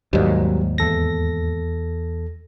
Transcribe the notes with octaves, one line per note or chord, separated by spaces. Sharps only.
D#2 G#2 F#3 G3
E2 A4 A#6